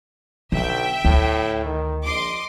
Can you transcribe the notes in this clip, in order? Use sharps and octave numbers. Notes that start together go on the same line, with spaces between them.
B1 D3 E5 G5
D2 A2
D#3
A#1 D#5 C6 D6